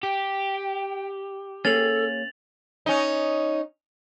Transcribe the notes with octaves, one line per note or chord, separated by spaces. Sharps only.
G4 G5
A#3 C#4 G#4 A4 A6 F7 F#7
C#4 D#4